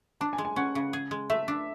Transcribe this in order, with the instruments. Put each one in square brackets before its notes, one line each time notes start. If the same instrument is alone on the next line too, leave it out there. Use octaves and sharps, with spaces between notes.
[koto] D4 [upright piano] A5
[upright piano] G#5
[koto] G#3
[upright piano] G#5
[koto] C#4 [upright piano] F#5
[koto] C#3
G#4
G#3
[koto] A3 [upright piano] E5
[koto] D4